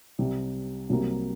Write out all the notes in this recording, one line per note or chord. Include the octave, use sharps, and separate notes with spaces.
C2 C3 G3
C2 C3 F#3 A#3